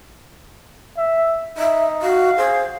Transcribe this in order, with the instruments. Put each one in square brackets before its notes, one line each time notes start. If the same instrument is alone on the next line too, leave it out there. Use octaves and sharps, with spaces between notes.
[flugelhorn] E5
[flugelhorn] D#4 [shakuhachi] E5
[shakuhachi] F#4 [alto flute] F5
[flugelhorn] G#4 [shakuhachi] C5